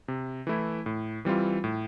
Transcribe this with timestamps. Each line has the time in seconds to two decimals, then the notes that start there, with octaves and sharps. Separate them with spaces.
0.08 C3
0.47 E3 A3 E4
0.86 A2
1.25 E3 G3 C4 F4
1.64 A2